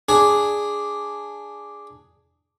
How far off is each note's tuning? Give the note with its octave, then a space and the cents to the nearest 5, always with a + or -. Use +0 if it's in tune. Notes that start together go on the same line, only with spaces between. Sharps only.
D4 +0 G#4 +0